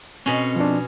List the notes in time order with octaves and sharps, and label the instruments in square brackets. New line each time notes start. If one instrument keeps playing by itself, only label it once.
[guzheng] B2 C#4 [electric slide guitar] C4 A4 D#5
[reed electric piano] F3 D4